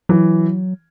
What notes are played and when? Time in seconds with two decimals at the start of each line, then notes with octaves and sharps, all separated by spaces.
0.09 E3 F#3